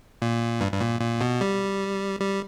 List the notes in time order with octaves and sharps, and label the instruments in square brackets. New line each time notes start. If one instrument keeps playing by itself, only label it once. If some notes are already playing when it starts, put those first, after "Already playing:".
[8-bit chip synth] A#2
G2
G2
A#2
A#2
B2
G3
G3